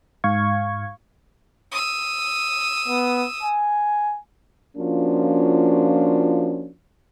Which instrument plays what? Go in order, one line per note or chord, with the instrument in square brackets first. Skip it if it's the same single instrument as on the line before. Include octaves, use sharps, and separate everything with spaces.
[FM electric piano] G#2 F5 C#6 G#6
[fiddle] D#6 E6
[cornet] B3
G#5
[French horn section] F3 A#3 C#4 D4 F4 F#4